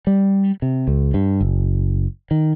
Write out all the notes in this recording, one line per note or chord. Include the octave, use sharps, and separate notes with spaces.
G3
C3
C#2
G2
F#1
D#3